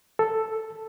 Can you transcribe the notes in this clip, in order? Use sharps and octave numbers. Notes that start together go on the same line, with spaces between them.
A4